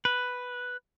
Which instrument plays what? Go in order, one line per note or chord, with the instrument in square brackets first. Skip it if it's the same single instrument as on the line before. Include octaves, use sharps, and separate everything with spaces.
[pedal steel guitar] B4